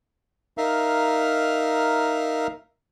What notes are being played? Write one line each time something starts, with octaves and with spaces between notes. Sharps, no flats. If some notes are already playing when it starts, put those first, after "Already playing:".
D#4 A#4 E5 F5